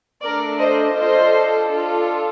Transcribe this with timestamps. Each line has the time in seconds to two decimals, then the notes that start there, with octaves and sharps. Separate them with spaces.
0.22 A3 D4 A4 A#4 D5
0.59 C5 D#5
0.95 D4 F4 A4 C5 D#5
1.68 D4 F4 A4